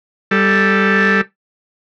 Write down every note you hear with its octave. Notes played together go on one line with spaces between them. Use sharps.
G3 A4